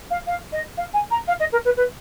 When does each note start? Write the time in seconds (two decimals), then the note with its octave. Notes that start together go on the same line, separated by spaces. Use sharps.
0.11 F5
0.27 F5
0.53 D#5
0.77 F5
0.94 G#5
1.11 A#5
1.28 F5
1.40 D#5
1.52 A#4
1.65 B4
1.77 B4